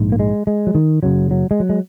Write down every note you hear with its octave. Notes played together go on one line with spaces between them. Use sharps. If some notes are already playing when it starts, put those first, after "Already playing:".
Already playing: A#1 G#2
A#3
G#3
G#3
F#3
D#3
F#1 F#2 C#3 F#3
F#3
G#3
F#3
G#3